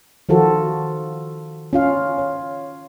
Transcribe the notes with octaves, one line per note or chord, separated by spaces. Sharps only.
D#3 F3 F4 F#4 A4
C#4 F4 F5
C#5